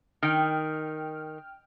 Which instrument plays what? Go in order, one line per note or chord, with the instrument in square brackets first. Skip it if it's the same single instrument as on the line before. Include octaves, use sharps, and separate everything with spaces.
[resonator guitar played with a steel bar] D#3 [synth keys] G5 F6